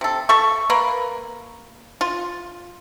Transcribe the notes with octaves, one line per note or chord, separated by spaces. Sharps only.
C3 A4
A4 E5 C#6
A#3 A#4 B4
F4